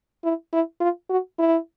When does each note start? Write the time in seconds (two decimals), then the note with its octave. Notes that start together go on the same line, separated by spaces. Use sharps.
0.24 E4
0.53 E4
0.81 F4
1.10 F#4
1.39 E4